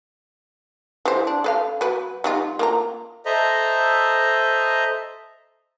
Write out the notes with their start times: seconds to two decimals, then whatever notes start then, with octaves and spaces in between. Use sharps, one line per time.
1.05 E3 G4 C5
1.27 D4
1.44 A4 B4 F5
1.81 F#3 B4
2.24 G3 D#4 F4
2.59 A#3 F4 A#5
3.26 A4 C5 D#5 E5 A#5